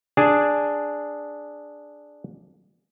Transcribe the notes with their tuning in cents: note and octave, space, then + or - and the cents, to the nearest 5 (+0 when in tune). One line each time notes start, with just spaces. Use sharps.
D4 +0 G#4 +0